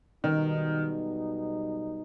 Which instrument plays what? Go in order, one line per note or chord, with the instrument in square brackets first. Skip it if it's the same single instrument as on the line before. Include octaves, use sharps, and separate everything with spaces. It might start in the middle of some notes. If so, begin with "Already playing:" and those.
[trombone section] B1 B2 G3 D#4 [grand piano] D#3